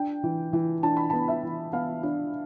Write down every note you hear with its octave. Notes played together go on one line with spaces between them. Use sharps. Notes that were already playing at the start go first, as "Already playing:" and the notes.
Already playing: D4 G5
E3
E3
D4 A5
B5
B3 A5
E5
E3
B3 F5
D4